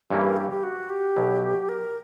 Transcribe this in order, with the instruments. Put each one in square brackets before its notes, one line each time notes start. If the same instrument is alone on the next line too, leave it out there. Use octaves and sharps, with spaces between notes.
[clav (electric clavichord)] G2 E3 G3 A#3 C#4 [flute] G4
[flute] A#4
G4
G4
F#4
G4
[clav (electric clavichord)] B1 B2 F#3
[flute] A#4